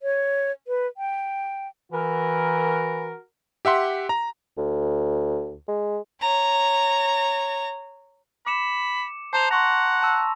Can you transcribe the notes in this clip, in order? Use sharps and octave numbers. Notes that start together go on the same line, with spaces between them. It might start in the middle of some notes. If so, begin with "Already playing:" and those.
C#5
B4
G5
E3 F#4 A#4
G4 E5 F#5 C6
A#5
D2
G#3
C#5 A#5
B5 D6 C#7 E7
C5 A5 A#5 F7
F#5 C6 C#6 A#6
A5 E6